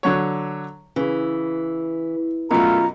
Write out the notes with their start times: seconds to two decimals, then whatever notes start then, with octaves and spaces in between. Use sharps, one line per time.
0.03 D3 F#3 C#5
0.96 C#3 E3
2.51 F#2 B2 A3 F4 A#4 A#5